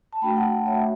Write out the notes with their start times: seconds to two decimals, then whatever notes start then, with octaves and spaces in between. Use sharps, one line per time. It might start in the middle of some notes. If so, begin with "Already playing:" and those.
0.13 A5
0.22 A3 D4 F#4 G5 B5
0.36 F#5 A5
0.66 C#5 E5